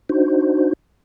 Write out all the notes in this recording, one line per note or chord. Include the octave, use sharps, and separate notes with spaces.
D4 D#4 F#4 C5